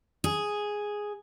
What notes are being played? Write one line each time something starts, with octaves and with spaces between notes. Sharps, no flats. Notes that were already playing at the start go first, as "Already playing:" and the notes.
G#4